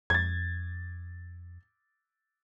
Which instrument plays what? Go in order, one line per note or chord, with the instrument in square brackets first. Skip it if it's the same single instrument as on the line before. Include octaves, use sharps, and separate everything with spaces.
[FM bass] F2 [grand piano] G#6 A6